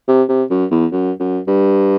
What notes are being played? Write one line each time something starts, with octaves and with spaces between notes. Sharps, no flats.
C3
C3
F#2
E2
F#2
F#2
G2